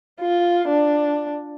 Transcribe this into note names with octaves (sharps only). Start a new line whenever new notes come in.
F4
D4